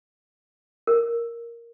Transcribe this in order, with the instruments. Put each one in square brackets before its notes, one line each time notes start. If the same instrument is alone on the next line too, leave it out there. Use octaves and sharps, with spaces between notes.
[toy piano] A#4